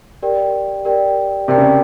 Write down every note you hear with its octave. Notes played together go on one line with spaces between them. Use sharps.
G4 A#4 D5 G5
G4 A#4 D5 G5
C3 G4 A#4 D5 G5
C#3